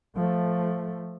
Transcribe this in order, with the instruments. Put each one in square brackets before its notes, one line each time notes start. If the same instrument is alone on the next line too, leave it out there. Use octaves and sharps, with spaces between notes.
[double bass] F3 A3